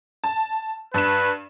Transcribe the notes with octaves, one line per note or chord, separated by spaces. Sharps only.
A5
G2 B4 E7